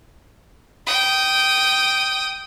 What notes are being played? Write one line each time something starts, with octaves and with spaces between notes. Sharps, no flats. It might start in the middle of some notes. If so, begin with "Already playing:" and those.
G5 D#6